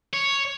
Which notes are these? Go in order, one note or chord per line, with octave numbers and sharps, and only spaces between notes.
C#5